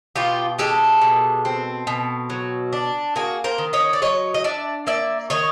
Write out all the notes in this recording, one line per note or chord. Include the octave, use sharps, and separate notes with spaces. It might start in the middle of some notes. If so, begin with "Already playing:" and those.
B2 F4 G4
G#3 G4 A4
B2
C4
B2
F#3
D4
A#3 F#4 G#4
A#4 C5
D#3
C#5 D#5
D5
F#3 C#5 D#5
D#5
D4 D5 E5
A#3 D5 E5
D#3 C#5 D#5